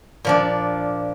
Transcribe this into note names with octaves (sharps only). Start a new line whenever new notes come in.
A#2 F3 D4